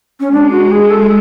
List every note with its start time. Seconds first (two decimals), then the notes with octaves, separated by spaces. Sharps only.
0.20 C#4
0.31 G#3 D4
0.51 F#4
0.72 G#4
0.90 A4